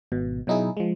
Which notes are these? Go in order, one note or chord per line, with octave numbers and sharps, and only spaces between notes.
G#1 B2
B2 F#3 D#4 E4 G#4
F3 G#3